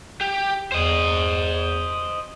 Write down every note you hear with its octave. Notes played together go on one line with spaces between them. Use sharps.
G4
E2 C5 D#5